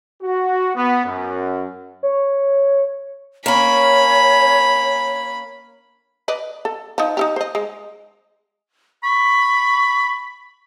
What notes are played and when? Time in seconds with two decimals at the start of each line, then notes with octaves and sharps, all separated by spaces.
0.22 F#4
0.76 B3
1.05 F#2
2.03 C#5
3.46 A#3 C#4 C#5 B5
6.28 B4 D5 D#5
6.65 A4
6.98 F3 D#4
7.17 D#4 E4 G4
7.36 C5 D#5
7.55 G#3
9.03 B5 C#6